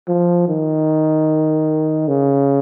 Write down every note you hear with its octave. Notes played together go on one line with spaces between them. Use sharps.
F3
D#3
C#3